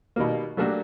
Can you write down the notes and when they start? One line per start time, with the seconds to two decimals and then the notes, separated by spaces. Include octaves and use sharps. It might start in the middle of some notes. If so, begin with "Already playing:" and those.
0.16 B2 D#3 G3 A#3
0.57 F#3 A3 A#3 D4 F#4 G4